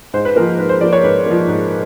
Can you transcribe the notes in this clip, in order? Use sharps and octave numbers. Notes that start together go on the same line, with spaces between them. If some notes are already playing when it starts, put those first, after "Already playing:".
G#2 C5
B4
F3 A#3 A#4
G#2 B4
C5
F3 A#3 D5
C#5
G#2 B4
F3 A#3
G#2